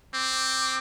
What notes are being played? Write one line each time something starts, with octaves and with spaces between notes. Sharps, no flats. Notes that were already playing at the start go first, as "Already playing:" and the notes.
C4 D6